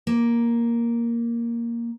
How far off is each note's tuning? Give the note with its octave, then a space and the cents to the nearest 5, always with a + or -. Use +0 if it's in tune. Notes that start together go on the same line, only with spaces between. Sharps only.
A#3 +5